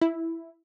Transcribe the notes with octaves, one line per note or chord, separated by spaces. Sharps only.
E4